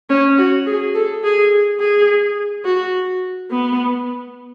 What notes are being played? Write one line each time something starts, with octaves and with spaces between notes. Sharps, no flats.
C#4
F#4
G#4
A4
G#4
G#4
F#4
B3